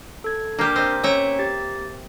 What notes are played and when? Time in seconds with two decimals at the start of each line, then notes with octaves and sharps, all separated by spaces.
0.24 A4 G#6
0.59 A#3 D4 G4 A#4
0.76 C4 D#5
1.03 C#4 C#5 E5 A#5 C#7
1.39 G4 A6